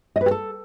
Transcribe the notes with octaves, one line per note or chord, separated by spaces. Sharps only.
D#5
B4
G4
A4